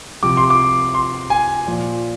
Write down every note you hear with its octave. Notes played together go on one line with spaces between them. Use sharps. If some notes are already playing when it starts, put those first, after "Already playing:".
C3 F3 D6
C6
D6
C6
G#5
A#2 F3